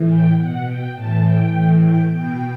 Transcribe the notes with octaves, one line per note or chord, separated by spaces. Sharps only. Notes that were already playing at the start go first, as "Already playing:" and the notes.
Already playing: A2 E3
G5
B2 F#5
G5
A2 E3 A5
G5
A2 E3
G5
B2 G5